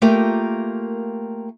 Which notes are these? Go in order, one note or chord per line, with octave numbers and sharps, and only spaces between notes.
A3 A#3 F4 G4 A#4